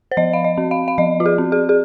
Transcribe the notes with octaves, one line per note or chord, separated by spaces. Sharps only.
C5
F3 D#5
F5
D#5
C4
F5
F5
F3 D#5
F4
G#4
C4
G#4
G#4